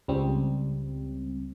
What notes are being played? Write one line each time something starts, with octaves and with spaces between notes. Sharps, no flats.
C#2 G3 C4